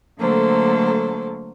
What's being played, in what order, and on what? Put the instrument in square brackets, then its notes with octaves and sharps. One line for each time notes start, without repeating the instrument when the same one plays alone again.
[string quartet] D3 F#3 A3 A#3 A4 C5